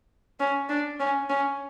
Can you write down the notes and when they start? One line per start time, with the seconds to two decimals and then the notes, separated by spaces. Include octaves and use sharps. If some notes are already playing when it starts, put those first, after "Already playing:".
0.40 C#4
0.69 D4
0.99 C#4
1.30 C#4